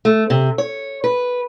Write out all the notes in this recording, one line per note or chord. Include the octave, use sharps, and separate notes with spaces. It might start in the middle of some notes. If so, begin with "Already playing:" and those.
A3
C3
C#5
B4